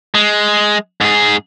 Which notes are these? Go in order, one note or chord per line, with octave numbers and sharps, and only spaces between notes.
G#3
G#2 G#4